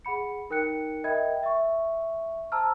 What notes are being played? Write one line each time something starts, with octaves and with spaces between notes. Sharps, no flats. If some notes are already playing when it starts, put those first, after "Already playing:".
G#4 F#5 B5 C#7
D#4 A#4 G5 F#6 C#7
A#4 D#5 E5 G5 B5 G#6
E5 C#6
C5 A5 A#5 E6 F6